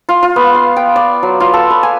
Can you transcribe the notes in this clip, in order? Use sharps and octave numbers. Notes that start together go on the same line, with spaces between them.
F4
F4
B3
F5
G5
D5
F#3
F4
A4
B4
G#5